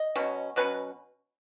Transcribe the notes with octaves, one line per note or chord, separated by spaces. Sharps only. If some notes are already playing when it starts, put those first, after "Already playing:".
Already playing: D#5
B2 F#3 C#4
B2 F#3 C#4 B4